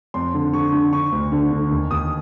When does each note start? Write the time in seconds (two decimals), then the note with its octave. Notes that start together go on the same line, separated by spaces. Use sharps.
0.14 F2 C6
0.34 D3
0.53 D3 C#6
0.72 D3
0.92 D3 C#6
1.12 D2
1.32 D3
1.51 D3
1.71 D#2
1.91 D#2 D#6